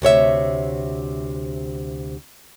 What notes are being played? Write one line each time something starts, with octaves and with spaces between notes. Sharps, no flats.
D2 C3 C#5 E5